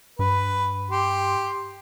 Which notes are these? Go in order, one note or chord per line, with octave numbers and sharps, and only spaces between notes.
G2 B4
G4 C6